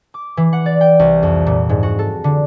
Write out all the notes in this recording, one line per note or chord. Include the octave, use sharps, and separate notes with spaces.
D6
E3
F#5
D5
G5
C2
F2
A#2
G#2
F#4
A4
D3